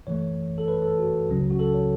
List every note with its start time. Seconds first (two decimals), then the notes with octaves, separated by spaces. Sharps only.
0.07 F#2 E3 A3 C#5
0.58 A4
0.68 B4
0.82 A4
0.98 F#4
1.29 C#2 C#3 F#3 C#4
1.51 F#4
1.59 A4
1.74 C#5